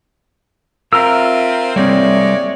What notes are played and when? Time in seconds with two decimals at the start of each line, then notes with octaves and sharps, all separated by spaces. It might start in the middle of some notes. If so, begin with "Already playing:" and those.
0.93 C4 F4 A#4 C5 E5 A#5 E6
1.76 G3 G#3 A#3 C4 C#5 D5